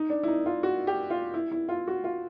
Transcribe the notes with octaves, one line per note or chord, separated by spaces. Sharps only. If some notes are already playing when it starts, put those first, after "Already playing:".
Already playing: D#4
D4
E4
D#4
F4
F#4
G4
F4
E4
E4
F4
F#4
F4